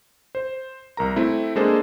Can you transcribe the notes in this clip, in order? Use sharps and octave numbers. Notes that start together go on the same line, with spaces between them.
C5
C2 A#4 A#5
A3 C4 E4
G#3 A#3 D4 G#4 A4 C5